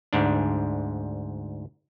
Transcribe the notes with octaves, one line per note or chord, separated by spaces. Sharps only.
D2 G#2 D4